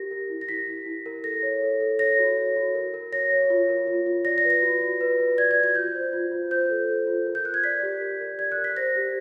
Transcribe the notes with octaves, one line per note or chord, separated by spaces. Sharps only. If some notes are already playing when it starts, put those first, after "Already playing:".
Already playing: G4 A#4 A#6
A#4
E4
A#6
E4 B6
E4
E4
A#4
A4 A#6
C#5
A4
A4
C#5 A#6
F#4
C#5
F#4
A#4
A#4
C#5 A#6
C#5
F4
A#4
F4
F4
D5 A#6
A#6
B4
A#6
F#4
F#4
B4
B4
D5 G#6
G#6
F#4
G#6
F4 G6
C5
F4
F4
C5 G6
A4
A4
F4
A#4
G6
A#4 F#6
G#6
D5 B6
G4
A#4
A#4
D5 G#6
F#6
A#4
B6
C5 A#6
G4